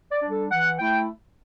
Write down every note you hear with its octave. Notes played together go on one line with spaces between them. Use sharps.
D5
G3 D4
A4
E3 F#5
A3 E4 G5